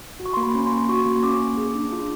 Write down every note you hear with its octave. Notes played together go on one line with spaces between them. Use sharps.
F#4
C#6
A#3 C6
B5
C#4
C6
A#3
C6
F#4 C#6
A#3
C#4 D6
A#3
G#4
D4
F4